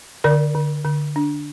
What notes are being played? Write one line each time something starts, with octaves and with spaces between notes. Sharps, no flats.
D3 A#4 D5
D3
D3
D4